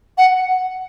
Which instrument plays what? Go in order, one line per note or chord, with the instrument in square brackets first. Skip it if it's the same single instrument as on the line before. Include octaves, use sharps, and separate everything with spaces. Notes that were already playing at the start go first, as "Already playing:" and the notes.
[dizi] F#5